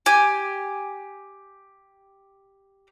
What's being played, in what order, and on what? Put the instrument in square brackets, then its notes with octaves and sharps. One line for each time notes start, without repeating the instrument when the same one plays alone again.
[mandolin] G4 G#5